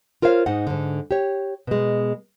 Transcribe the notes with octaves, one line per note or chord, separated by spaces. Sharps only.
F4 A#4 C5 C#5 F5
G#2 D#4 F#5
G#2 D3
G4 C#5
B2 G#3